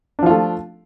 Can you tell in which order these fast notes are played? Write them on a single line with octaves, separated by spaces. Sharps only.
D4 F3 F4 A3